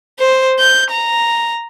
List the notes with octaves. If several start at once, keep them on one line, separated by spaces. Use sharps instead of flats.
C5
G6
A#5